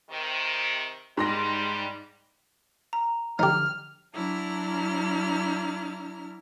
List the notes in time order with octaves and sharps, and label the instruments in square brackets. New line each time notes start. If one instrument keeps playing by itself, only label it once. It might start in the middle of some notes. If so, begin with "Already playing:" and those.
[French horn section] C3 D#3
[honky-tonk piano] G#2 C6 A#6 [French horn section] G3
[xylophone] A#5
[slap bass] D3 F3 F#3 [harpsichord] D#4 G4 [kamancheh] F6
[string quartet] F#3 D4 E4 A#5 F6